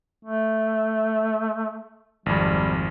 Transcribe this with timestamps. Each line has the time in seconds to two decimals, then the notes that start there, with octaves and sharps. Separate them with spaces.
0.25 A3
2.26 G#1 F2 G3